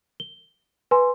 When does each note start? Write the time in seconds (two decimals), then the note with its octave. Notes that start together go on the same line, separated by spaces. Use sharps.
0.20 G7
0.91 B4 G#5 C6